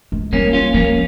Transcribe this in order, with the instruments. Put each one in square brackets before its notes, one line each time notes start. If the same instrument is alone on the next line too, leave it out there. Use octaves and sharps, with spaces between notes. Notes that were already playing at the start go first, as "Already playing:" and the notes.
[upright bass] G#3
[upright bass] G3 [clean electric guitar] A#3 C#4
[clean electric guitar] C#4 F4
[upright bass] F3 [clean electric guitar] A#3 C#4